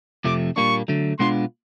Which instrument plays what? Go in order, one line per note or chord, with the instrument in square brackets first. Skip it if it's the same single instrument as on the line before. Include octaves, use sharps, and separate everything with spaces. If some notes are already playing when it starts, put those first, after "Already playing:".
[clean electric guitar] F2 C3 F3 A3 [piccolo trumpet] D6
[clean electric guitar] A#2 G3 A#3 D4 [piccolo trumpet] C#6
[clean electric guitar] D3 F#3 A3
[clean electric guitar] B2 G#3 B3 D4 F4 [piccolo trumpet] C6